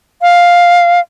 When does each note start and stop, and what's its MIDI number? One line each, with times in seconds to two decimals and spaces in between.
0.22 1.00 77